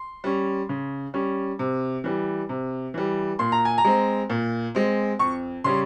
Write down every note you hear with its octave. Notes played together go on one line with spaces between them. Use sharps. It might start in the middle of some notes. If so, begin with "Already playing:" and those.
Already playing: C6
G3 C#4
C#3
G3 C#4
C3
E3 G3
C3
E3 G3
A#2 C6
A#5
G#5
A#5
G#3 C4
A#2
G#3 C4
F2 C#6
C#3 G3 C#4 C6